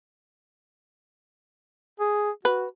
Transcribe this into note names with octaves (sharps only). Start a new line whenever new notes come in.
G#4
F#4 B4